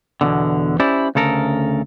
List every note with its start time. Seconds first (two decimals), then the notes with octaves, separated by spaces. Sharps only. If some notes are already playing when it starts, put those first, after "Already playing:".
0.21 E2 G2 B2 D3
0.80 C#4 E4 G4 C5 D5
1.15 D2 C#3 A4 A#4